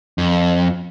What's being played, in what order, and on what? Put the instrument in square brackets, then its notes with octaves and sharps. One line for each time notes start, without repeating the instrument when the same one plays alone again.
[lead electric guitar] F2